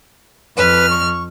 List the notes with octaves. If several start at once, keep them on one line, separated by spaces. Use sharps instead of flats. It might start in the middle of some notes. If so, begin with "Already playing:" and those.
F2 B4 F6
C#6